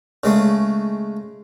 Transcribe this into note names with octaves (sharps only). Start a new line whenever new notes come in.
C#3 G#3 A3